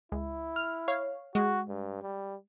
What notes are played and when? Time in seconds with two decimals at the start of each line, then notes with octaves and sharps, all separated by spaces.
0.12 C#2 E4
0.56 F6
0.88 C#5 F5
1.35 G#3 F#4
1.68 G2
2.02 G3